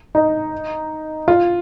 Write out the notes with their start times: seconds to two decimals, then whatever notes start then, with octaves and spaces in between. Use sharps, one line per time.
0.15 D#4
1.28 F4